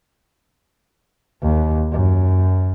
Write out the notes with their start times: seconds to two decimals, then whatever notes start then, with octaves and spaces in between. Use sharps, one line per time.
1.42 D#2
1.92 F#2